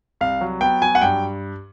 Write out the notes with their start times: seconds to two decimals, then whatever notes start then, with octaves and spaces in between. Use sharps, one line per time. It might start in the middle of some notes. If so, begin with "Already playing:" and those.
0.21 C2 F5
0.41 F#3
0.61 B3 G5
0.82 F#3 G#5
0.95 F#5
1.01 G2 G5